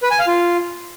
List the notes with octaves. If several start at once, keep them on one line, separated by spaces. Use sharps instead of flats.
B4
G#5
F5
F4